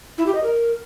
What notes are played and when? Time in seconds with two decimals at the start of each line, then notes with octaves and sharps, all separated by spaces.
0.18 E4
0.26 G4
0.35 D#5
0.43 A#4